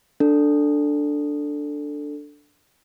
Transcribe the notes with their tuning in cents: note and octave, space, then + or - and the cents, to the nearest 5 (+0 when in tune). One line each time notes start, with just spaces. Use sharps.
D4 +0 A4 +10